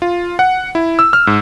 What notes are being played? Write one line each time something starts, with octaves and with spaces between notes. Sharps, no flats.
F4
F#5
E4
E6
F6
G#2